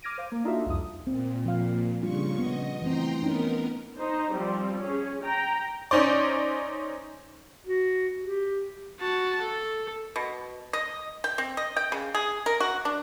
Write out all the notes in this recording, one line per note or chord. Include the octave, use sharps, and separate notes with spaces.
D6 F6 G#6 A#6 D7 D#7
C5 F5 D6
A#3
D4 D#4 F4 F#4 A4 E5
C2 F2 D#6
A#2 C4
F3 F5
C#3 G3 D4 F4 C#6
B3 D#5
E3 A3 C4 G5 A#5 C6
B3 C#4 D#4 A#4
D#4 C5
F3 G3 C4
C#4 G#4
G5 A#5
C#4 D#4 C5 D5
F#4
G4
F#4 A5
A4
B2
D#5
G5
C4
D#5
G5
C#3
G#4
A#4
F#4
D4